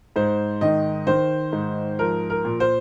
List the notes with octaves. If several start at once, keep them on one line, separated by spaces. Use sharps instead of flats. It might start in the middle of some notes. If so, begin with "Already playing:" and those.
G#2 C5
D#3 D#5
D#3 C5
G#2
F3 A#4
A#4
A#2
C5